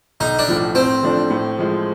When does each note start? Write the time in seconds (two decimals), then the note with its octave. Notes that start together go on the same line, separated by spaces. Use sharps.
0.20 B1 D#4
0.39 D4
0.48 A2 F3
0.75 A2 C4
1.03 F3 A3 D4
1.30 A2
1.58 F3 G#3